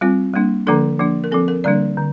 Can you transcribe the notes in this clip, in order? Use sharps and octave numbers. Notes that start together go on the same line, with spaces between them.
G3 C4 F4
G3 A#3 D4
D3 F3 A#3 D4 A4
F3 A#3 D4
A#4
F3 C4 A4
A#4
D3 G3 A#3 D4 D5
D3